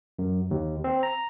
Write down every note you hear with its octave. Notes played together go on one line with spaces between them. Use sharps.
F#2
D#2
C4
A#5